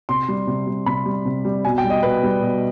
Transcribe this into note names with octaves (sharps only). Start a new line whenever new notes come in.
C3 C6
G3
C3
G3
C3 B5
G3
C3
G3
B2 G#5
G5
G3
D#5
B2 B4
G3
B2